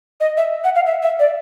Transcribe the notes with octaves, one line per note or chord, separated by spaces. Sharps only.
D#5
E5
F#5
F5
E5
E5
D5